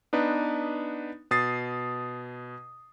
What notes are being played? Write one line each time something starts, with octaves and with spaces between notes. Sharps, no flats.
B3 D4 D#4 B4
B2 D#6 A6 C7